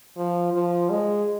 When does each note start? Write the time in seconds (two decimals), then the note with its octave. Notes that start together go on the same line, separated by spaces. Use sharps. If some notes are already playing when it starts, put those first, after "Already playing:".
0.17 F3
0.54 F3
0.90 G#3